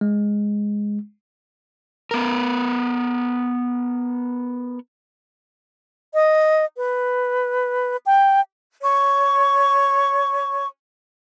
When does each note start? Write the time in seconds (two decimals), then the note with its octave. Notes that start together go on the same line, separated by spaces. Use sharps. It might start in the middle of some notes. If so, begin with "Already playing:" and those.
0.01 G#3
2.11 B3 A#4
6.14 D#5
6.77 B4
8.06 G5
8.80 C#5 C#6